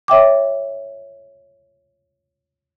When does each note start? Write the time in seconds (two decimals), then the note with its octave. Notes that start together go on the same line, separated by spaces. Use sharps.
0.08 C#5 E5 G5 D6